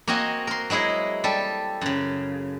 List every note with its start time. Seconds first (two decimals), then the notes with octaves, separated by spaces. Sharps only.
0.08 A#3 C4 F#4 D#5 G#5
0.47 A#4 C6
0.70 F#3 G#3 E4 G#4 D#5
1.24 G3 A4
1.81 F#2 C#3